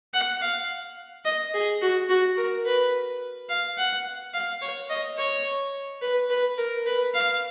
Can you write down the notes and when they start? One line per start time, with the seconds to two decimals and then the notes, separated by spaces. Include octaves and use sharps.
0.14 F#5
0.41 F5
1.25 D#5
1.54 G#4
1.81 F#4
2.09 F#4
2.37 A#4
2.66 B4
3.49 F5
3.78 F#5
4.34 F5
4.62 C#5
4.90 D#5
5.18 C#5
6.02 B4
6.30 B4
6.58 A#4
6.86 B4
7.14 F5